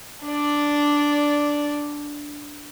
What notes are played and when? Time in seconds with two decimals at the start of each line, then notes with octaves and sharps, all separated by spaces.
0.25 D4 D5